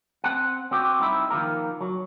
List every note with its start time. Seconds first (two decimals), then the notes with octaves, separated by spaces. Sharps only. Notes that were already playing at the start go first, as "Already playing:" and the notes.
0.24 C4 F#5
0.71 C4 F#4 G4
0.99 G3 C4 D#4 E4
1.30 D#3 F3 A#3 A#4
1.81 F#3